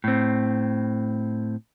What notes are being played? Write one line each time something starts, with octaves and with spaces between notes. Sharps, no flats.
A2 C4